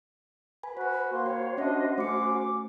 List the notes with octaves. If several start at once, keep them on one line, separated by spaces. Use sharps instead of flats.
B4 G#5
F#4 C5 B5
A#3 C6
F#4 C5 C#5 G5
C#4 D4 C#5 D#5 E5
A3 C#4 D6 C#7